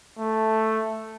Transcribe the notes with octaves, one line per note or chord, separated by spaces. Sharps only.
A3